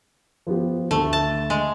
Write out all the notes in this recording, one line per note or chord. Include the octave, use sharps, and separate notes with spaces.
F3 B3 G4
D2 A3
A5
G#3